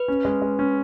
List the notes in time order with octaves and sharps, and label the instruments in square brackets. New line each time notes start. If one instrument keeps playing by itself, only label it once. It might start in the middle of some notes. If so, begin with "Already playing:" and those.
Already playing: [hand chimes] B4
[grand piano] C#4
G#3
G#3
C#4